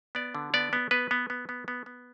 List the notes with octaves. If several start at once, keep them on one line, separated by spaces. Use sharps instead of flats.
B3 D5
D3
B3 D5
B3
B3 B4
B3
B3
B3
B3
B3